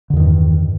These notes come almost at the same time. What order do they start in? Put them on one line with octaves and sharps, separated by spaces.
D3 E2 D#3 G2